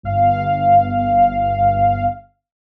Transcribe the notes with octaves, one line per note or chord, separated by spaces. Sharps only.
G1 F5